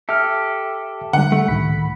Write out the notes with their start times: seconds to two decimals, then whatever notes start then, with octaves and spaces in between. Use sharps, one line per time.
0.09 G4 A4 E5 F6
1.13 D3 G3 F#5
1.32 A3
1.48 C#2 A2 D#3 B5